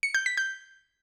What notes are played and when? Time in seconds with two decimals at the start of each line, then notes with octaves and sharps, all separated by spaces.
0.03 C#7
0.15 G6
0.26 B6
0.37 G6